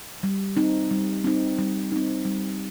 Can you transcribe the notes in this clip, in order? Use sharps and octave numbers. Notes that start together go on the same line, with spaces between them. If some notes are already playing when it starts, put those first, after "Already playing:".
G3
C4 D#4
G3
C4 D#4
G3
C4 D#4
G3